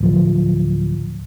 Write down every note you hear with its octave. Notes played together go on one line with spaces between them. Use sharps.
D1 F3